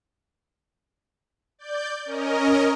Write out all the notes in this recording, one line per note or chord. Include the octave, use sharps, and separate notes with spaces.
D5 G6
C#4 A#4 D#5